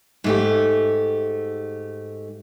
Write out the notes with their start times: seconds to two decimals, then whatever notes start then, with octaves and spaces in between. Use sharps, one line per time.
0.24 G#2 A3 G4